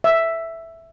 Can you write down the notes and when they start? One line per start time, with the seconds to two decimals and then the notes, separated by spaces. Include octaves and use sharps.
0.04 E5